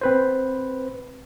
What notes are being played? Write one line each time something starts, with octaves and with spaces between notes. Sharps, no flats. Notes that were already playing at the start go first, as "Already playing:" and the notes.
C4 B4 C5